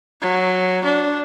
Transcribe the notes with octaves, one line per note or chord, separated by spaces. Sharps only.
F#3
D4